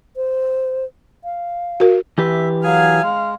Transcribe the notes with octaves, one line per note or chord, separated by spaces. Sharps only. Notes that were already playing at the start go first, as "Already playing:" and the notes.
C5
F5
F#4 A#4
E3 G4 B4 E5
F#3 G#4 F5 G#5
G#3